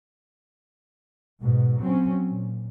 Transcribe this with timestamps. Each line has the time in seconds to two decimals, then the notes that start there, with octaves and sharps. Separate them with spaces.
1.41 G#2 B2
1.81 F#3 C4 C#4
2.28 A#2